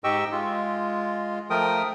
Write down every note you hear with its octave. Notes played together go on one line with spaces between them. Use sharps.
G#2 G4 D#5 G5 C#6 E6
G#3 F4
F3 A3 A#4 G5 D#6